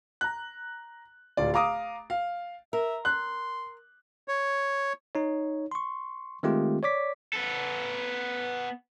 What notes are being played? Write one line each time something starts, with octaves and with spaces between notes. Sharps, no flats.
A#5 F#6
D1 F4 D5
F5 A#5 D6 D#6
F5
A#4 E5
C6 F#6
C#5
D#4 C#5
C6 C#6
D#3 G#3 A3 C4 F4 G4
C#5 D5 D6 B6
B3 A4